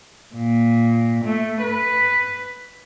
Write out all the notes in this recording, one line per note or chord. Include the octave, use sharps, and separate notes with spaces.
A#2
A3
B4